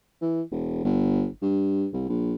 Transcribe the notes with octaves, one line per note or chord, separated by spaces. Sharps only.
E3
E1
G1
G2
C2
A#1